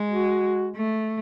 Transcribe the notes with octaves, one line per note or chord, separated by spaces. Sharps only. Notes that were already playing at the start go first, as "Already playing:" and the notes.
Already playing: G#3
F#4
A3